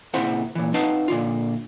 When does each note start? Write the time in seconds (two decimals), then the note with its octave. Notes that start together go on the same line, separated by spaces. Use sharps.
0.14 A#2 C#3 C4 E4 C5 F#5
0.55 A#2 E3
0.74 C4 D#4 B4 F5 F#5 A5
1.08 A#2 D3 F4